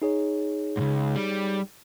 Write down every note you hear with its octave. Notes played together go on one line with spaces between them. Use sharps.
D#4 G#4 C#5
C#2 G#2
G3